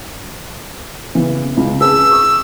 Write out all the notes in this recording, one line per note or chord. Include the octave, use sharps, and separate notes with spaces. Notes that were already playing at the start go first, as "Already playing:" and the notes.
C#3 E3 B3
C#2
G#4 B4 A5 E6
C#6 D#6